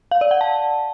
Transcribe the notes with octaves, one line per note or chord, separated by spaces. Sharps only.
F5
D5
F#5
A5